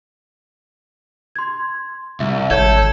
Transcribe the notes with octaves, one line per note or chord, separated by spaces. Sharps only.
C6 G#6
C2 E5
G#1 A4 C#5 G6 G#6